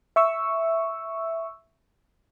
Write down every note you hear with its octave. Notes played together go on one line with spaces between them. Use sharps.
E5 C#6 E6